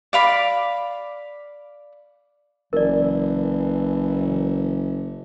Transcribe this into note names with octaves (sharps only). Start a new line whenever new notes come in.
D5 F5 B5 D6
F#1 E3 A#4 D5